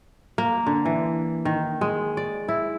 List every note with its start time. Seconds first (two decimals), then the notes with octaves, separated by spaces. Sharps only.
0.38 A#3
0.67 D3
0.85 E3
1.45 D#3
1.81 G#3
2.17 D5
2.49 E4